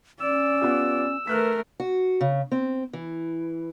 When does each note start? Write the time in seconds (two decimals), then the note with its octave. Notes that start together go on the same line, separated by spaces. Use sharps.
0.20 C#4 D5 E6
0.61 B3 F4 G4
1.27 A3 A#4 B4 F6 F#6 B6
1.80 F#4
2.21 C#3
2.52 C4
2.93 E3